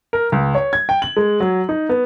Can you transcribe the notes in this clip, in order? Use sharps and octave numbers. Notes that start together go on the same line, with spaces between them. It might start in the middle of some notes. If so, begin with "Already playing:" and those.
A#4
C#2
C#5
G#6
G5
F#7
G#3
F#3
D#4
B3